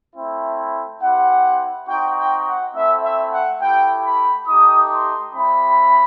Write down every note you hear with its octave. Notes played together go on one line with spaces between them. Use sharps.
A3 C4 E4
C4 E4 G4 F#5
C4 D#4 F#4 G5
G5
F#5
A3 C4 E4 E5
E5
F#5
A3 E4 G4 G5
B5
A3 D#4 G4 D#6
C6
G3 C4 E4 B5